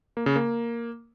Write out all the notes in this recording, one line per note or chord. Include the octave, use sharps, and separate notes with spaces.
A#3
C#3
A#3